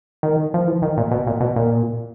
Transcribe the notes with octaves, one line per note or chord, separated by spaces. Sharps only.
D#3
F3
E3
D#3
A#2
B2
A#2
B2
A#2